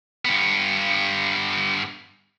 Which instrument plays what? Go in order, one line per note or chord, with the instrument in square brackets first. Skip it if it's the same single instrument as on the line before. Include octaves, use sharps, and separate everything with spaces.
[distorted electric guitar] G2 B3